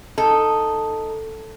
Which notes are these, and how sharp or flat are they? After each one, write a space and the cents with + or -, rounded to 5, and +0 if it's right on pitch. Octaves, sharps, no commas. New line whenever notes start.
D#4 +0 A4 +5